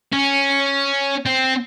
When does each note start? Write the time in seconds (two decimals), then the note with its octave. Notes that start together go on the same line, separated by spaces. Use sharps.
0.12 C#4
1.26 C4